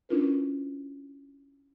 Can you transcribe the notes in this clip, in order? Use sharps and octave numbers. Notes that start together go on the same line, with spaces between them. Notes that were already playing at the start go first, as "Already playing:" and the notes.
C#4 D4 E4 F4 A#4 B4